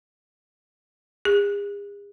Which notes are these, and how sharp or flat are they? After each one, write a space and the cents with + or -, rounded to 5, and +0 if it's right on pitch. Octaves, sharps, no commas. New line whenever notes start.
G#4 -45